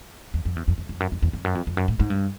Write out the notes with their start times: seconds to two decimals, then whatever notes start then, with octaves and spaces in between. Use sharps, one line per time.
0.34 E2
0.45 F2
0.56 E2
0.68 F2
0.78 F2
0.89 F2
1.00 F#2
1.12 F2
1.22 E2
1.33 F2
1.44 F#2
1.55 F2
1.67 F2
1.77 F#2
1.88 A2
2.00 G#2
2.10 G2